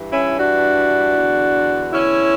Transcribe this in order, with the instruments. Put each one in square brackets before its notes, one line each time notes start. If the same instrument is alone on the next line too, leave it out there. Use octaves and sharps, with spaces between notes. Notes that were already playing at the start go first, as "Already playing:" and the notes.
Already playing: [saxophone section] G2 E3
C#4 E4
D4 F#4
E2 D3
C#4 E4